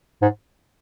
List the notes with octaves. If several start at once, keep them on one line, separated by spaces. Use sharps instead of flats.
G#2